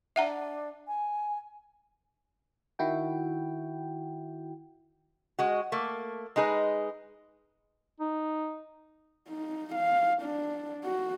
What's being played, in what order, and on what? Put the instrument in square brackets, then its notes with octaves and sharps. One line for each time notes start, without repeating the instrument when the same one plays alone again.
[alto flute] D4 [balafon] E5 F#5 A#5
[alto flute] G#5
[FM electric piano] D#3 E4 F#4 G5
[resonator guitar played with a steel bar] G#3 F#4
A3 A#3
G#3 D#4 G#4 B4
[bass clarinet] D#4
[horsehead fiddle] D#4
F5
D4
F#4